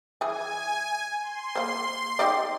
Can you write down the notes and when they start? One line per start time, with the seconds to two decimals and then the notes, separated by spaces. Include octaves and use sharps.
0.21 E3 G#4 G#5
1.22 C6
1.55 A#3 C5
2.19 D#4 G4 D5